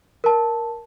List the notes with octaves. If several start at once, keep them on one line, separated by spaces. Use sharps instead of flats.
A#4 A5